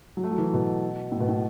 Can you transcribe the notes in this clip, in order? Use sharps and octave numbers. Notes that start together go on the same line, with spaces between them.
F#3
A3
F#3
E3
B2
A2
B2
A2